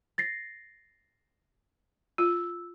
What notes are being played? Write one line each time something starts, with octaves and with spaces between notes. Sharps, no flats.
A6 A#6 C7
F4 E6